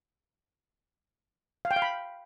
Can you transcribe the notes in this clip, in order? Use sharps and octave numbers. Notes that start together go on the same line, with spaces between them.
F5
G5
F5
B5